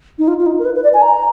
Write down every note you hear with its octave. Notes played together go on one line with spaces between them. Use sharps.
D#4
F4
F4
D#4
A#4
B4
B4
D5
G#5
A#5